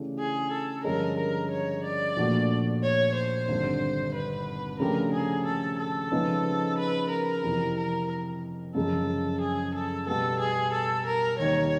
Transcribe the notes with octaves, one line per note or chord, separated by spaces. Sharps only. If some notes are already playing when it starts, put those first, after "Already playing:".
Already playing: C#3 E3 A3 D4 G4
G#4
A4
G2 D3 F3 G#3 C#4 A#4
A#4
C#5
D5
A#2 F3 A3 D4 F#4
C#5
C5
G#1 G2 D3
B4
C#3 F3 A3 D4 G4 A#4
G#4
A4
A4
C#3 F3 G#3 B3 D#4
B4
A#4
F2 C3 E3
A#4
F#2 C#3 F3 G#3 A4
G#4
A4
B2 G3 B3 A4
G#4
A4
A#4
D#2 D#3 G3 C#5